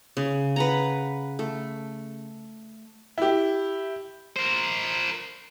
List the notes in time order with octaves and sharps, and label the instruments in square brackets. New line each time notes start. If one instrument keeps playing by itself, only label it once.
[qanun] C#3
B4 F#5 A#5
A3
[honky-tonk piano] E4 G4
[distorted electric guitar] A#4 C5